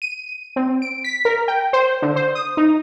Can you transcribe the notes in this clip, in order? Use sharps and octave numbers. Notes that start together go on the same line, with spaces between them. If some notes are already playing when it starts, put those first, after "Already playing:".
D#7
C4
D7
B6
A#4
G5
C5
D3
C5
D#6
D#4